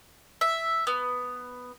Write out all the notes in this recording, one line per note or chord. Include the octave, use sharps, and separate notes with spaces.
E5
B3